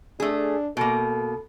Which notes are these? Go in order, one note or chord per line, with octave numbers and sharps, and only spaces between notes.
A3 D4 G#4
B2 A#3 A4